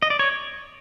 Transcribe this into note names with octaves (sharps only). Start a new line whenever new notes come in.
D#5
D5
C#5